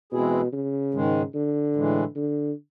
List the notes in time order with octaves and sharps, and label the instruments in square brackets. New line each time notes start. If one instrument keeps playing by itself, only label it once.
[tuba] B2 [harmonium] E3 G#3 C4 E4 G#4
[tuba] C#3
[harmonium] G#2 D#3 G#3
[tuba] D3
[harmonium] A2 E3 G#3
[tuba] D3